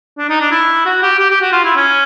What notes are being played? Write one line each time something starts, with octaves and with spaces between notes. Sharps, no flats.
D4
D#4
D4
E4
F#4
G4
G4
G4
F#4
F4
E4
C#4